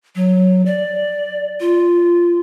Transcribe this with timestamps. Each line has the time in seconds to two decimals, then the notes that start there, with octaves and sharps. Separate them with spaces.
0.15 F#3
0.66 D5
1.61 F4